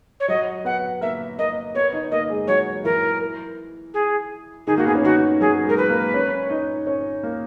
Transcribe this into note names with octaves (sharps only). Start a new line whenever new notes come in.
C#5
F#3 F#4 D#5
B3 B4 F#5
A#3 A#4 E5
A#3 A#4 D#5
B3 B4 C#5
D#4 D#5
A#3 A#4 D#5
G#3 G#4
F#3 F#4 C#5
E3 E4 A#4
G#4
D#3 D#4 G#4
A#3 F#4
B3 G#4
C#4
D#3 D#4 F#4
F#3 F#4 G#4
G#3 G#4 A#4
B4
A#3 A#4
C#4 C#5
C#5
D#4 D#5
C#4 C#5
A#3 A#4